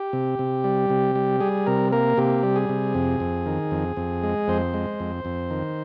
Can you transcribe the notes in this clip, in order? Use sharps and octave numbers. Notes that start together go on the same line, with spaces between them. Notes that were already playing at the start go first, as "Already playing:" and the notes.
Already playing: G4
C3
C3
G3
C3
G3
G3 G#4
C3 A#4
A#3 A#4
C3 G4
G3
G#4
C3
F2
F2
D#3
F2
F2
G#3
F2 C5
G#3
F2
F2
D#3